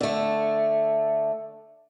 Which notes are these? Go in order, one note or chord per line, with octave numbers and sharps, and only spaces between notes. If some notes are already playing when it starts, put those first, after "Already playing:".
D3 A3